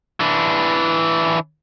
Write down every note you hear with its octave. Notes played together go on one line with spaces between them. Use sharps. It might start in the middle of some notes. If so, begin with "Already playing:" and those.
E3 D4